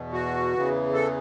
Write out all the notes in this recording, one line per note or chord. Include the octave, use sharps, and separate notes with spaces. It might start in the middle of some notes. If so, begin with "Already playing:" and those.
Already playing: E2 B2
F#4
E2 C#3 E3
A4